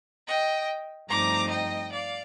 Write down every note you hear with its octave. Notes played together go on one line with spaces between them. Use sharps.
D#5 G5
G2 F3 A3 C4 D#4 A#5 D6
D#5 G5
D5 F5